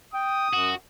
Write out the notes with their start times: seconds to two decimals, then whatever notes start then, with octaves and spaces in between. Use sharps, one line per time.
0.14 G5 D#6
0.53 F#2 F#4